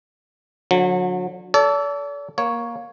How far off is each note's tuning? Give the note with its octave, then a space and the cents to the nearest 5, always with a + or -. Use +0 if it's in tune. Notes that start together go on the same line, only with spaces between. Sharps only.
D3 +0 F#3 -35
A4 +0 D5 -45
A#3 +15 C#5 +0